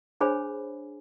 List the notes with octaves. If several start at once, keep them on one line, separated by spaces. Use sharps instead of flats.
D4 G#4 C5 C#5 G#5 B5